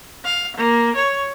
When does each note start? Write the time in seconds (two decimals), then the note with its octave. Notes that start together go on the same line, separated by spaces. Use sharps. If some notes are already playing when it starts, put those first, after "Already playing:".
0.25 F5
0.57 A#3
0.96 C#5